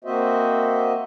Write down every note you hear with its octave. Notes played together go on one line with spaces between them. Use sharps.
A#3 C4 F#4 C5 D#5 E5